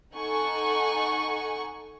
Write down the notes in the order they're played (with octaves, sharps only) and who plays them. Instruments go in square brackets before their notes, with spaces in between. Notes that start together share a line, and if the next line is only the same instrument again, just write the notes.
[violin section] D#4 A4 F#5 G#5 C#6